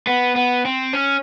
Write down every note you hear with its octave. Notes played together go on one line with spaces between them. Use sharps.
B3
B3
C4
C#4